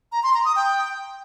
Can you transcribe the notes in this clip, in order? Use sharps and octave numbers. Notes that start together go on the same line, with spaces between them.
A#5
C6
A#5
D#6
G5